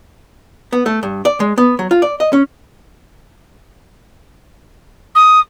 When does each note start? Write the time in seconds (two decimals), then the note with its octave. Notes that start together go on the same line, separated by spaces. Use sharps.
0.73 B3
0.86 A3
1.03 G2
1.25 D5
1.40 G#3
1.58 B3
1.79 F#3
1.91 F4
2.02 D5
2.20 D#5
2.33 C#4
5.15 D#6